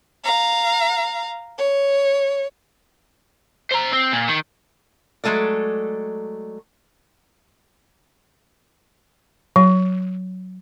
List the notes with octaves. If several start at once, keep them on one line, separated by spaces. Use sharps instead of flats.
F5 A#5
C#5
C5 A#5
C4
A#2
D#3
F#3 G#3 A3 A4 D5
F#3